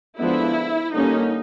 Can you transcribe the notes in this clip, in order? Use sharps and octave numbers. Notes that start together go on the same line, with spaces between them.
D3 F3 G#3 B3 D4 E4
D3 G3 A#3 C#4 D#4